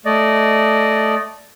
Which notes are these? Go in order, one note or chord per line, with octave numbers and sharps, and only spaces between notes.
A3 D5 D#5